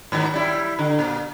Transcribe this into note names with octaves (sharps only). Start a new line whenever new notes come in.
G#2 D#3 F#3
G3 E4
D3
A#2